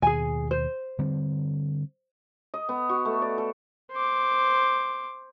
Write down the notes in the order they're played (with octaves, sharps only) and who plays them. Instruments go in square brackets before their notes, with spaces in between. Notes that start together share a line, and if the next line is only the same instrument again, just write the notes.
[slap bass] D#2 B2 [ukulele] G#4 G#5
[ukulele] C5
[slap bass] D3 G3 C4
[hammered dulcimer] D#5
B3
F#4
A3
D5
A4
[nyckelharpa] C5 D6